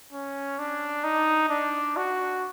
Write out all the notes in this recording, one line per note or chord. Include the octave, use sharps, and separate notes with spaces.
C#4
D4
D#4
D4
F#4